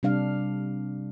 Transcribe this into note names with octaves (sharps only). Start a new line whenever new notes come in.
C3 G3 D4 F5